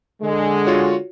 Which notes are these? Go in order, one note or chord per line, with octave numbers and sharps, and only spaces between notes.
D3 G#3
F4 F#4 C#5